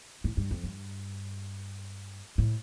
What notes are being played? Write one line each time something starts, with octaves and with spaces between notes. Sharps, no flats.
A2
G2
F2
G2
A2